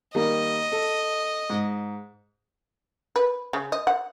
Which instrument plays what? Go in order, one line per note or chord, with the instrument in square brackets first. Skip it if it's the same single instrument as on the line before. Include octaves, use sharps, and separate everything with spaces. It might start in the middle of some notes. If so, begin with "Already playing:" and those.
[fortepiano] D#3 G3 A#3 [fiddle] D#5
[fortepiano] A4
G#2
[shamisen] B4
C#3
D#5
F#5